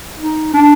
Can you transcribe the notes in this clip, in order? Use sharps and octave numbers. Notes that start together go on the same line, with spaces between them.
D#4
D4